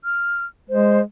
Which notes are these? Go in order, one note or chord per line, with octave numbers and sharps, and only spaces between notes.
F6
G#3 C5